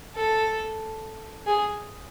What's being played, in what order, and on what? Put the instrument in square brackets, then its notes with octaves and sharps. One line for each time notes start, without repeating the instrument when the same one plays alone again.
[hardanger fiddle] A4
G#4